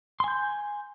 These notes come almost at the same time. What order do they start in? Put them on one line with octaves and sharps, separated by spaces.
C6 G#5 G6